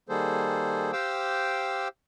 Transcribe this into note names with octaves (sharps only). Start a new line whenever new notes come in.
D#3 G3 A#3 G#4 A4 C5
G4 C5 F5 G5 D6 E6